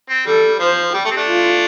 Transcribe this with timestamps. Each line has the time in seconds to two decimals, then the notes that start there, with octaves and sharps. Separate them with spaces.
0.09 C4
0.26 G3 A4
0.60 F3 C5
0.93 G3 G4
1.05 A3
1.11 C4
1.16 A3 D4
1.28 F4